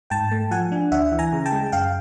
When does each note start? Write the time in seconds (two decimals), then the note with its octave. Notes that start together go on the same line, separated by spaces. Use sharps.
0.10 G#2 G5 A5
0.31 A3
0.51 F3 F#5 G#5
0.72 D4
0.92 D2 E5 F#5
1.12 E3
1.19 G#5 A#5
1.33 C#3
1.46 G5 A5
1.52 G#3
1.72 F#2 F5 G5